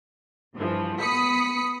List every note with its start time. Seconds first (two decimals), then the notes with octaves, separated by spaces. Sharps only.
0.55 G2 E3 F3
1.00 B3 B5 D#6 B6 C#7